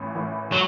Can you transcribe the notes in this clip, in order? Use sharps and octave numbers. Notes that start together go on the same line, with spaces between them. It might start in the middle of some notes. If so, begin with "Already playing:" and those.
Already playing: A1 A2 E3
A2 E3
F#3